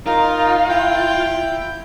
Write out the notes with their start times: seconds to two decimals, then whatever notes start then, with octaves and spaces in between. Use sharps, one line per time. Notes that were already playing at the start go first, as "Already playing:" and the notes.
0.07 D#4 F4 A#4
0.69 E4 G5 G6